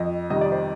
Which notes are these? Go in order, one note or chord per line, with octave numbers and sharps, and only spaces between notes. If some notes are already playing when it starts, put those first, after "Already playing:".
Already playing: F2 D#5
C3 D#3 G3 D#5
D5
C5